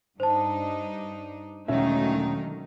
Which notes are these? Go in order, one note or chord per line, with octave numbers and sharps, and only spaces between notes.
G2 D4 D#4 C5 A5
E1 D3 D#3 F#3 A3 C#4 D#4 E5